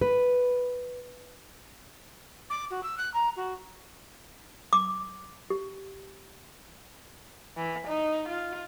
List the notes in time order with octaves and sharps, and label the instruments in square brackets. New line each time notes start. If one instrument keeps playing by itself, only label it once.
[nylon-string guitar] B4
[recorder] D6
F#4
E6
F#6
A#5
F#4
[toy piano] D6
G4
[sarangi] E3
D#4
F4